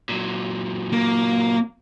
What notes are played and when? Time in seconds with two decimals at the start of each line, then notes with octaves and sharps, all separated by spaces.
0.09 A#2 F#3
0.93 A#3